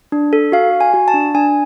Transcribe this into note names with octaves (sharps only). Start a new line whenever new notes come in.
D4
A4
F#4 F5
F#4
G#5
F#4
A5
D4
D4 G#5